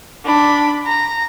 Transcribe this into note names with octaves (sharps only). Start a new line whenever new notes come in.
D4 B5
A#5